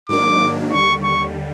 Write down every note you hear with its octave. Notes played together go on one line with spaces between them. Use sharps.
G#2 D#3 F#3 A#3 D4 D6
D#2 D3 G3 C#6
C#6